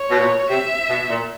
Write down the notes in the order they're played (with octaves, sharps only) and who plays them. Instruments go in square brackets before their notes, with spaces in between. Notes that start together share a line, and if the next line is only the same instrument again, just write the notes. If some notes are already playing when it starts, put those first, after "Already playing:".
Already playing: [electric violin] C#5
[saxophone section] B2
A#2
[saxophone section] C3 [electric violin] E5
[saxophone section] B2
A#2